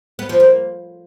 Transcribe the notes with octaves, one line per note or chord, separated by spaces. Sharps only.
B3
F3
A#3